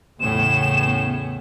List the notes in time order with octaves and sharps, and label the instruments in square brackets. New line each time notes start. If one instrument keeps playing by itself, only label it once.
[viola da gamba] E2 A2 C#4 [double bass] C#3 B3 [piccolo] E7